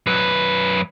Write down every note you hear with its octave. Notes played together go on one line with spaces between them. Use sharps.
F#2 B4